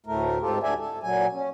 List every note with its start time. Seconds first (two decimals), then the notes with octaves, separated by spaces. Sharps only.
0.06 D2 A2 A3 A#4
0.41 G#2 C4 F4 G4 A4
0.63 D2 D3 A3 D5 E5 G#5
0.79 A4
1.03 A#2 F#3 G#5
1.33 C#4